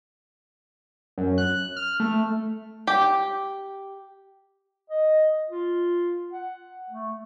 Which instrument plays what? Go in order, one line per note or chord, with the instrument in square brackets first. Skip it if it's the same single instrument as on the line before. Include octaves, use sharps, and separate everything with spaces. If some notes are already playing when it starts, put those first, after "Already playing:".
[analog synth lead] F#2
F#6
F6
A3
[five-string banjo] G4
[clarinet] D#5
F4
F#5
A3